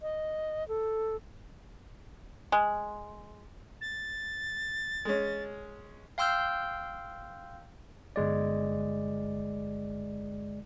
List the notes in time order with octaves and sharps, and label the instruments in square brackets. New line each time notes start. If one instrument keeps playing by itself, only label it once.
[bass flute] D#5
A4
[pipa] G#3
[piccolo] A6
[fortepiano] G#3 C#4
[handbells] F5 G5 C6 E6 F6 G6
[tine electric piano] G1 G#3 D5